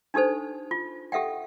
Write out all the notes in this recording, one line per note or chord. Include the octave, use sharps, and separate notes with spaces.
D4 D#4 G4 A4 C5
F4
G4 A4 E5 F#5 G5